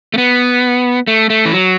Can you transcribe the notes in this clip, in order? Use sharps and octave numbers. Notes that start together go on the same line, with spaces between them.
A3
B3
A3
A3
E3
F#3